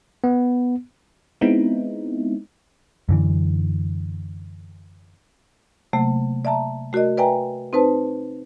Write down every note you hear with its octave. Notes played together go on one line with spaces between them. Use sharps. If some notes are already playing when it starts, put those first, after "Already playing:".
B3
G#3 B3 C4 D#4 E4
F#2 D3 E3
C3 F#3 A3 A#3
D5 E5 A5 A#5
A3 F#4 A#4 D5 D#5
B4 D5 E5 G5 G#5 A#5
C4 D#4 B4 C5 A5